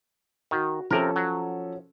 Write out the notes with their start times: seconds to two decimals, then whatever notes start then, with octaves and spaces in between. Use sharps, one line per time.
0.51 D#3 F#4
0.91 C3 F3 C#4 A4 A#4
1.16 F#3